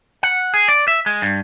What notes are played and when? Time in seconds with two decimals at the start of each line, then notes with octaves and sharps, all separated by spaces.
0.23 F#5
0.54 G#4
0.68 D5
0.88 E5
1.06 G#3
1.22 G2